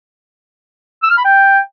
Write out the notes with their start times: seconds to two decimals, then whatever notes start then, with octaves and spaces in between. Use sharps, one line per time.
1.03 E6
1.10 F6
1.17 B5
1.25 G5